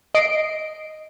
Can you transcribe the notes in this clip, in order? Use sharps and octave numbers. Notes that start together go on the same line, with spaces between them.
D#5 C7 D7